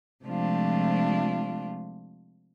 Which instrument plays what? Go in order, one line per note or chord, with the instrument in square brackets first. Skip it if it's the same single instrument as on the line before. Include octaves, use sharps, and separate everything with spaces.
[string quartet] C3 F3 G#3 A3 D4 F4